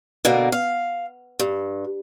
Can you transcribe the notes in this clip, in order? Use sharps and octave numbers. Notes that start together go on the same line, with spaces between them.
B2 D3 A#3
F5
G2